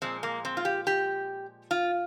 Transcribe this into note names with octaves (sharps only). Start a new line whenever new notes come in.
A#2 F3 G#3 C4
A#3
C4
F4
G4
G4
F4